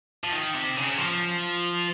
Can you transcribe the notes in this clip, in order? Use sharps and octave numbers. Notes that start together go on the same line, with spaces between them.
F3
D#3
C3
C#3
F3